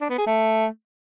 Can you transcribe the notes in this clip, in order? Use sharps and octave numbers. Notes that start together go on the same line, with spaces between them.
D4
B3
G#4
A3